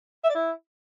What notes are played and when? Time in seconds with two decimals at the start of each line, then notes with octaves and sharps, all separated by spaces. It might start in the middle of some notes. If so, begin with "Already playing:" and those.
0.24 E5
0.30 D5
0.35 E4